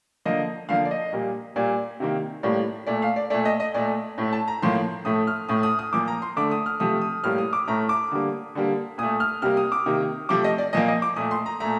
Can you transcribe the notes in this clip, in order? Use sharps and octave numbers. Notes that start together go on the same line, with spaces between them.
D3 F3 A#3 D#5
D3 F3 A#3 F5
D5
D#5
A#2 G3 A#3
A#2 G3 A#3 D5
C3 D#3 A#3
A2 G3 A#3 D5
A#2 A3 D5
F5
D5
A#2 A3 D5
D#5
D#5
A#2 A3 D5
A2 A3
A5
A#5
A2 F3 A#3 C6
A2 A3 D#6
F6
A2 A3 D#6
D#6
D#6
A#2 F3 A#3 D6
A#5
C6
D3 A3 D6
D#6
F6
C3 F3 A3 D#6
D#6
A2 G3 A#3 F6
D#6
D6
A2 A3 A#5
D6
D3 G3 A#3
D3 G3 A#3
A#2 A3 D#6
F6
C3 G3 A#3 F6
D#6
D6
C3 D#3 A#3
C3 F3 A3 D6
D#5
D5
A#2 F3 A#3 D#5
D#5
D6
A#2 A3 D#6
C6
A#5
A#2 A3 A#5